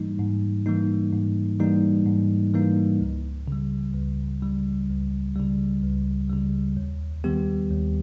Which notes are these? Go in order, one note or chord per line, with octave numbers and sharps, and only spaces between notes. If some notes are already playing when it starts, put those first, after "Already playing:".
Already playing: G#2 E3 G3 A#3 D#4
G#2
E3 G3 A#3 D#4
G#2
E3 G3 A#3 D#4
G#2
E3 G3 A#3 D#4
C#2
C#3 G3
C#2
C#3 G3
C#2
C#3 G3
C#2
C#3 G3
D#2
D#3 G3 B3 G4
D#2